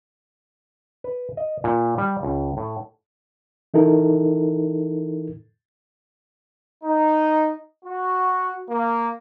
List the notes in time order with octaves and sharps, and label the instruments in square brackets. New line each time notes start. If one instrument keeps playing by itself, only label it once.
[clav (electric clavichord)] B4
D#5
A#2
G3
C#2
A2
[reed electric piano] E3 D#4 E4 A4 A#4
[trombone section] D#4
F#4
A#3